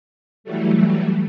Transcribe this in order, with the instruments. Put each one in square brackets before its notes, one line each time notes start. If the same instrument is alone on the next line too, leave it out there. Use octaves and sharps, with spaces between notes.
[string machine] E3 F#3 G3 A3